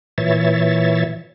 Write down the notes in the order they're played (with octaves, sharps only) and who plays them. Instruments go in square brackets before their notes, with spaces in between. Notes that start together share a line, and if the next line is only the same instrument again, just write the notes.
[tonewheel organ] A#2 E3 C#5 E5 A6